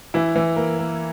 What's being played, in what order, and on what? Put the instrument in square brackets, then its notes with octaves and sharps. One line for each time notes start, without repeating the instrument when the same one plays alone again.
[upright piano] E3 E4
E3
A#3
A#3